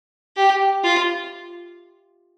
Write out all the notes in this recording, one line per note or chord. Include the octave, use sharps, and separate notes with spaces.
G4
F4